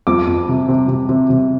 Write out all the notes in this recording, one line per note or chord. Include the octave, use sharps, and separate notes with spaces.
F2 D6
F2
C3
C3
C3
C3
C3